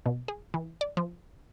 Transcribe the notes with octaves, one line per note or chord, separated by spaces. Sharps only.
B2
G#4
E3
D5
F3